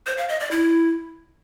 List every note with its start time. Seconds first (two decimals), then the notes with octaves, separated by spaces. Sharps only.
0.06 C5
0.18 F5
0.29 D#5
0.40 D5
0.51 E4